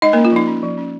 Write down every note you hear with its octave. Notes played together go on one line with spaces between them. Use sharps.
G#3 D#4 D#5
A#3 A#4
C#4
F4
F3 D#4
C#4
F3
C#4